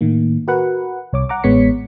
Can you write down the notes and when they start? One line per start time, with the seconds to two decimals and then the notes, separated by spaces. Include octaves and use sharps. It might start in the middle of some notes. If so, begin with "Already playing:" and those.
0.01 A2 D#3 A#3
0.48 F#4 A#4 B4 F#5
1.13 C2 C#5 D6
1.29 F#5 A#5 D6
1.44 A1 G#3 B3 C#5 B6 C#7